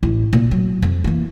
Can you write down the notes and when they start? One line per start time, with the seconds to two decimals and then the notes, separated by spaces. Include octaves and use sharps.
0.03 A1 E4
0.33 A#2
0.51 F#3
0.82 F2
1.04 E3 A#3